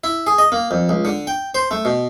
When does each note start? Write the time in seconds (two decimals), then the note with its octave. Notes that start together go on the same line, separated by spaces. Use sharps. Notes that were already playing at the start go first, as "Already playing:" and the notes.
0.04 E4
0.27 G#4
0.38 D#5
0.52 A#3
0.71 F2
0.89 C#2
1.05 D3
1.27 G5
1.55 C5
1.71 A3
1.85 B2